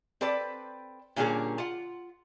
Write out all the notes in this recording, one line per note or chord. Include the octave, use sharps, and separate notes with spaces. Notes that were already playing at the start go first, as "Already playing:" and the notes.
C4 A4 B4 D5
A#2 D3 G3 A#3 C#4 G#4
F4 F#5